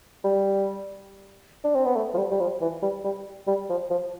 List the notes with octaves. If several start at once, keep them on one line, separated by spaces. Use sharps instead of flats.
G3
D4
C4
B3
A3
F3
G3
G3
F3
E3
G3
G3
G3
F3
F3